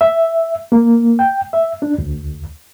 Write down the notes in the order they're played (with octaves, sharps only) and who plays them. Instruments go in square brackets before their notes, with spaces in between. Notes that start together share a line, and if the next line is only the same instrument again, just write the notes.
[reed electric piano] E5
A#3
G5
E5
D4
D2